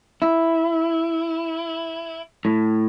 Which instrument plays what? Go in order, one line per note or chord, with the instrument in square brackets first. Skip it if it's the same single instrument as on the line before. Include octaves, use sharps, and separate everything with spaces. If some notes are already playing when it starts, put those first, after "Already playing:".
[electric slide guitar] E4
A2